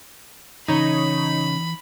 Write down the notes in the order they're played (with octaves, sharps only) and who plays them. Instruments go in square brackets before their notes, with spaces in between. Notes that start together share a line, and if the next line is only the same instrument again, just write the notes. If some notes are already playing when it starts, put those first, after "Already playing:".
[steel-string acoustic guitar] C#3 [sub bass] E3 [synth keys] D#4 C#5 [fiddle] B5